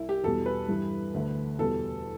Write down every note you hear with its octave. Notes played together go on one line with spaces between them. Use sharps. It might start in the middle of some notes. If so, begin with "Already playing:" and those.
Already playing: C2 E4
G4
E2 B2 G3 A4
B4
G2 E3 G3
D2 D3 A3
E2 B2 G3 A4